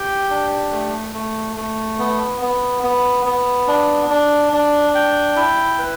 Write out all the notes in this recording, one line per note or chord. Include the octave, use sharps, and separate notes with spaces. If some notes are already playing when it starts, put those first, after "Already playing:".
Already playing: G4 G5
D4
A3
A3
A3
B3
B3
B3
B3
D4
D4
D4
G5
E4
B4